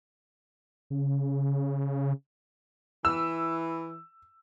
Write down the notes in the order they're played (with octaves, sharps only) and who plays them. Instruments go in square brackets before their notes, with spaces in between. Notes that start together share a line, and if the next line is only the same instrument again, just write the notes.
[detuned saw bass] C#3
[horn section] E3 [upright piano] E6